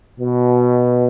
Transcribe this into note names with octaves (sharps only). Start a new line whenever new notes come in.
B2